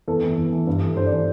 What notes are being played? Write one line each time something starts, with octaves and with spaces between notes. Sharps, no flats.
E2 A4
E3
E2
E3
G2
E3
G2 C5
D5
E3